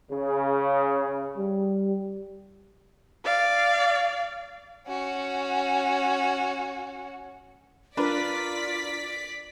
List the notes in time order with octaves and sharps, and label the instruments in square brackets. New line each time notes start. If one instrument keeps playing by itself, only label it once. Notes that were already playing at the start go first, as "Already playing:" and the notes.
[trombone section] C#3
[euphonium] G3
[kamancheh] D5 F5
[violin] C#4 F#4
[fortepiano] D4 A#4 B4 [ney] F4 [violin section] D5 B6